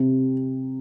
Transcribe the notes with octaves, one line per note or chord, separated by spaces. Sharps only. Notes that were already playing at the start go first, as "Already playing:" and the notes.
Already playing: C3